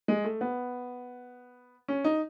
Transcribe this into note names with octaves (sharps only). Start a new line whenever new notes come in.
G#3
A3
B3
C#4
D#4